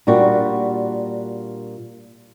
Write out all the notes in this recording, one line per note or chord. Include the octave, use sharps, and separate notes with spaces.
A#2 G3 D4 F#4